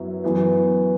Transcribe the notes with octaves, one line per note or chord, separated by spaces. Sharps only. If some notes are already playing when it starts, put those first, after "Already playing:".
Already playing: F#2 F#3 B3 E4
F#2 E3 B3